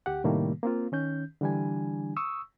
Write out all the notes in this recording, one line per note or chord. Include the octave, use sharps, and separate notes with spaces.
D2 G4 F#5
A2 C3 D#3 G3 A3 A#3
A#3 C4 F4
D#3 C#4 G6
D3 E3 G3 D4 G#5
C#6 D#6 E6